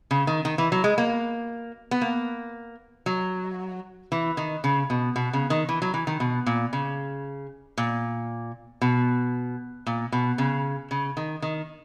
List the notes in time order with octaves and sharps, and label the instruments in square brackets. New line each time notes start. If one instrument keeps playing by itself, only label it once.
[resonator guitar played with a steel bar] C#3
D#3
D#3
E3
F#3
G#3
A#3
B3
A#3
F#3
E3
D#3
C#3
B2
B2
C#3
D#3
E3
F#3
E3
D#3
B2
A#2
C#3
A#2
B2
A#2
B2
C#3
C#3
D#3
D#3